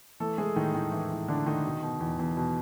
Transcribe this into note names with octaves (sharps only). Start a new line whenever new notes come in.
E3 A3 A4
E3 G#3 G#4
A2 D#3 D#4
A2
E3
E3
A2 D3 D4
A2 D#3 D#4
B2
B2
E2
E2
B2